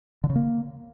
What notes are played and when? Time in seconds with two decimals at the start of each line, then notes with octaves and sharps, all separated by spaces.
0.24 D3
0.30 C#3
0.36 A#3